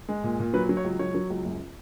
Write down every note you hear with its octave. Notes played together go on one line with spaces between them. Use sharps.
G#3
A#2
A#2
F#3 B4
F#3
C#5
C#2
F#3 C#5
F#3
C#2
F#2